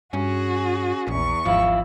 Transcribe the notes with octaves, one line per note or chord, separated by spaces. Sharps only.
G2 C#4 F#4 G#4
A#1 E2 C#6
G#1 F3 E4 F5